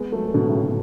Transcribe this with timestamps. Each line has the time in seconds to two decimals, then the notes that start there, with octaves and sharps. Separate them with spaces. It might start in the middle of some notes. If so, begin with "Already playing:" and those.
Already playing: G#3 B3
0.12 F#3 A3
0.34 B2 D3
0.49 A2 C#3
0.62 B2